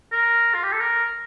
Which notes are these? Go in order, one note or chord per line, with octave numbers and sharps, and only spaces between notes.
A#4
F4
G4
A4
A#4